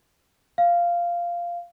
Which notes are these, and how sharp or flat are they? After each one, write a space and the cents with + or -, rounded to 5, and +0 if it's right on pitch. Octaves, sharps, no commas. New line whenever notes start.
F5 -10